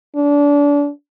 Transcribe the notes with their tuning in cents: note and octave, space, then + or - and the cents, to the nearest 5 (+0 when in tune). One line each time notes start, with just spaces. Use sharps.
D4 -30